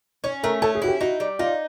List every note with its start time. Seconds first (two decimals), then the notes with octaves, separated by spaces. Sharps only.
0.24 C#4 C#5
0.43 A3 A#4
0.62 C#4 A4
0.75 G#4
0.82 E4 F#4
0.88 G4
1.01 D#4 F#4
1.20 G3
1.39 D#4 F4